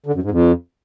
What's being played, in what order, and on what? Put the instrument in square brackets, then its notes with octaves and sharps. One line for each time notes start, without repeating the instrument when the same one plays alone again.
[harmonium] D3
F#2
G#2
F2